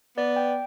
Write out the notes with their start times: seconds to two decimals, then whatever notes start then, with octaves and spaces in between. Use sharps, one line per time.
0.17 B3 D5
0.36 G5